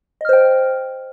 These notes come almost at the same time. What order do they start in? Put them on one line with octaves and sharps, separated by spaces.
D#5 F6 C5 G5